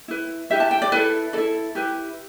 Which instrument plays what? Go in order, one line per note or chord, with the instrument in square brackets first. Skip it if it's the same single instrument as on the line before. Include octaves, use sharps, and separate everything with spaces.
[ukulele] E4 B4
E4 G4 B4 E5
A5
G5
D5
E4 A4 B4
E4 A4 D5
E4 G4 B4